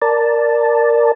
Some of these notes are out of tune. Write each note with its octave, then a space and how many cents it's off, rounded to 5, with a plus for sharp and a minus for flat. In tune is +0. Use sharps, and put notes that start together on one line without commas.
A#4 +0 D5 +0 A5 +0